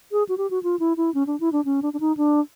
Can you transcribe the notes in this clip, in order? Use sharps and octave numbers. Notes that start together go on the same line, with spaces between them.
G#4
F#4
G4
F#4
F4
E4
E4
C#4
D4
E4
D4
C#4
D4
D4
D#4
D4